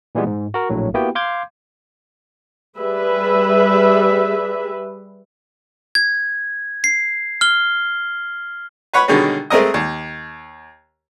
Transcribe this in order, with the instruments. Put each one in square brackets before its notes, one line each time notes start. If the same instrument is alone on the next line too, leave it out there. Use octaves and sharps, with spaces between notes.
[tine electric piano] A#2 E3 G3 G#3 B3
G#2
F#4 A#4
A#1 A2 F#3
A#3 B3 E4 F#4 G4 G5
F5 C6 D6 G6 G#6
[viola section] G3 G#4 B4 E5
[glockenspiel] G#6
C7
F6 G7
[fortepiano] B4 C#5 F#5 B5
B2 D3 D#3 G3 G#3 C#4
G#3 A3 C4 A#4 D#5
D#2